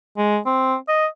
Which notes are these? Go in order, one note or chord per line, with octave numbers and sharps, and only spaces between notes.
G#3
C4
D#5